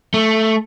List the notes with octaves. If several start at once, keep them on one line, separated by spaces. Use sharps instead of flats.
A3